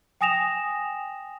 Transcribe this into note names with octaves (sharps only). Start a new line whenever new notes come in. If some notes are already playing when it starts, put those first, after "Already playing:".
G5 G#5 D#6 A#6 E7 F7